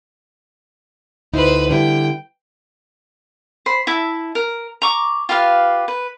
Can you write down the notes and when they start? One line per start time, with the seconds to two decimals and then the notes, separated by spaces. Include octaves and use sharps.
1.33 D2 D#4 E4 B4 C5
1.69 D3 G3 E4 G5
3.66 C5 B5
3.87 E4 E5 A5
4.35 A#4
4.82 A#5 C#6 D6
5.29 F4 G4 B4 F5
5.88 B4